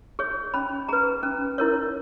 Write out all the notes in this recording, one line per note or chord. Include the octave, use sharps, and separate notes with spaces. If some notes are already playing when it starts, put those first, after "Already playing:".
G#4 C#5
C#4 B5
G#4 B4 A#5
C#4
E4 A#4 C#5